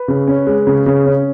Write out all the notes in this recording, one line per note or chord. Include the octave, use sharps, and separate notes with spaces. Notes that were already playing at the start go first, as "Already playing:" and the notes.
Already playing: B4
C#3
C#4
G#3
C#3
C#3
C#4